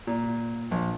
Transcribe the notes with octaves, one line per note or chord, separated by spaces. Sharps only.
A#2
A#1